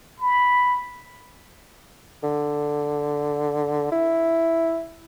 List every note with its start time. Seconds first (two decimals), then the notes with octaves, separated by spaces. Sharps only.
0.20 B5
2.23 D3
3.92 E4